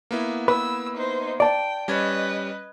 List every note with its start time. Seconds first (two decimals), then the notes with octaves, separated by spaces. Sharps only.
0.11 A#3 B3 E4
0.48 B4 E6
0.97 D#4 C5
1.40 D5 G5 A5
1.88 G3 C#4 B4 D#5 G#6